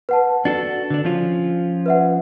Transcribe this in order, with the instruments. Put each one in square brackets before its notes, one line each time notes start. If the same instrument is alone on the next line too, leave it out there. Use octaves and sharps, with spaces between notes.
[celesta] B4 F#5 A5
[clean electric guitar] D4 F#4 A4 [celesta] A6
[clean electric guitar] D3 D4
F3 C#4 F4
[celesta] B4 E5 F#5